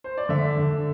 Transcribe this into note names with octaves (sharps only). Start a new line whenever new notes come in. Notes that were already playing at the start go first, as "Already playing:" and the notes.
C5
D5
D3 E5
D3